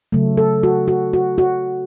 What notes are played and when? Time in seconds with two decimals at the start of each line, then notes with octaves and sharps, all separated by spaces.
0.12 C#3 F#3 A3
0.37 A4
0.63 F#4
0.88 F#4
1.13 F#4
1.38 F#4